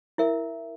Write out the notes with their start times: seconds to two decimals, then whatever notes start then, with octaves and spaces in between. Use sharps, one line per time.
0.18 E4 A#4 E5